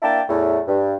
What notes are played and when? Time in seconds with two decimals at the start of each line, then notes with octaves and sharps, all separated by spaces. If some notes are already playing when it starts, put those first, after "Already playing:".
0.02 A#3 D4 E4 G5 A5
0.29 E2 A2 A3
0.67 G2